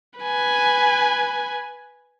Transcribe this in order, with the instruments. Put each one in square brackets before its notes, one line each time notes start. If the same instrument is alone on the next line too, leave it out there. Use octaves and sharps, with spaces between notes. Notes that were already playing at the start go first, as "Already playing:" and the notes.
[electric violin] B4 G#5